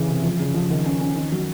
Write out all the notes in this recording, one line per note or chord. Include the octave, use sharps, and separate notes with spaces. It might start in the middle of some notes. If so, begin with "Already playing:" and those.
Already playing: C#3 E3
C3
F3
C#3
F3
D#3
C#4
C#4
D#3
F#3